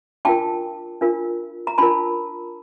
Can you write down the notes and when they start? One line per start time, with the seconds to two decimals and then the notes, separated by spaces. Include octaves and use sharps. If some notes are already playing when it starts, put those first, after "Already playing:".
0.25 D4 F4 A#4 G5 A5
1.01 D4 F4 A#4
1.67 A#5
1.78 D4 F4 A#4 A5 B5